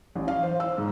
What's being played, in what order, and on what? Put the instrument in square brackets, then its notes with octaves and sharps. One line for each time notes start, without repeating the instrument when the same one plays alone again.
[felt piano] A1
F5
C5
E6
G#2